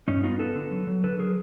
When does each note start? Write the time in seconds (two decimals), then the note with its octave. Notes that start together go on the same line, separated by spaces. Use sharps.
0.08 G2 C#4 D#4
0.23 B3 D#4 F4
0.39 B3 A4 B4
0.55 D3
0.71 F#3
0.87 F#3
1.04 D3 A4 B4
1.19 F#3 G#4 A#4